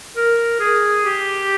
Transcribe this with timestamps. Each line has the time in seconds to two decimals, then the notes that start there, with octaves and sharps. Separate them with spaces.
0.17 A#4
0.60 G#4
1.04 G4